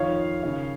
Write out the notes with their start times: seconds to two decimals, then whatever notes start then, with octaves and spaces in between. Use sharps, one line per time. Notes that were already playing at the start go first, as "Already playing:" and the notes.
Already playing: F2 D#3 C#5 F5
0.43 D#2 C#3